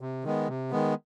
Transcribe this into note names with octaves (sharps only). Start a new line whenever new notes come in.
C3
D#3 G#3 B3
C3
D#3 G#3 B3